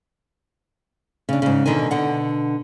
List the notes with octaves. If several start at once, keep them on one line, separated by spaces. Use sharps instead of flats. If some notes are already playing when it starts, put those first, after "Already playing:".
C#3 D4
G#2 C#3
B2 D3 D#3 A#4 G#5
B2 D3 F#5